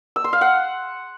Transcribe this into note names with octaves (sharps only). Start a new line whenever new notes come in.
E6
C6
F5
F#5